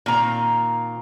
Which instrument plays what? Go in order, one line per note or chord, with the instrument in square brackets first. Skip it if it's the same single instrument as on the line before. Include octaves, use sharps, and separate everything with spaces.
[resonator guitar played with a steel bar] A#2 D#3 C4 A#5